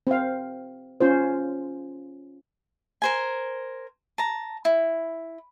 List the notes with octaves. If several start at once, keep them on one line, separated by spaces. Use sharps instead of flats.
C4 F5
C#4 F4 C5
A#4 C5 G#5
A5 A#5
E4